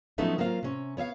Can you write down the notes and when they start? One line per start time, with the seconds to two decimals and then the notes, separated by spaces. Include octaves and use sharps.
0.18 F3 F#3 A3 B3 C#4 D#4
0.38 F#3 A#3 C4 F4 F5
0.63 C3 C#4
0.97 B3 C#5 E5 F5